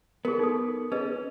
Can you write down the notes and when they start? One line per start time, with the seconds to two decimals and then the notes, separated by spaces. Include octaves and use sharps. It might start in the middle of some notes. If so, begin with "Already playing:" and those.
0.25 B3 G#4 A#4
0.39 D#4 A4 D#6
0.92 C#4 G#4 B4 D#5